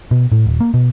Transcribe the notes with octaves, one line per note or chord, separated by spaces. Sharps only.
B2
A2
D#1
A#3
B2